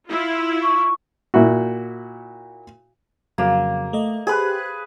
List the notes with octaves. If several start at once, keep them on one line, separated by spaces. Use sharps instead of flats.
E4 F4
C#6
A#2 E4 F#4
F2 C#3 F#3 A#3
A3 D#5
G4 G#4 B4 C5 F#6